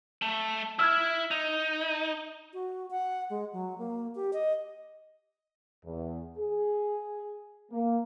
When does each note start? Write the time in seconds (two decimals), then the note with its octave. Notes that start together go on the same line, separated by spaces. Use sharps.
0.22 A3
0.79 E4 E5 E6 F6 G#6
1.31 D#4 F7
2.53 F#4
2.91 F#5
3.30 G#3
3.53 F#3
3.78 A#3
4.15 G4
4.33 D#5
5.85 E2
6.38 G#4
7.71 A#3